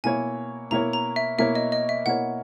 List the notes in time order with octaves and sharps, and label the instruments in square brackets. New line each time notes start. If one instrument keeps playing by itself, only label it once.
[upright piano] B2 A#3 E4 A#4 C#5 [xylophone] G#5
[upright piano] B2 A#3 E4 A#4 C#5 [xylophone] A#5
[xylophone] A#5
E5
[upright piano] B2 A#3 E4 A#4 C#5 [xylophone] E5
[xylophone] D#5
D#5
E5
[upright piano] B2 A#3 E4 A#4 C#5 [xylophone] F#5